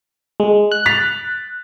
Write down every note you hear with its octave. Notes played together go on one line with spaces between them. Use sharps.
G#3
F#6
A6 B6 F7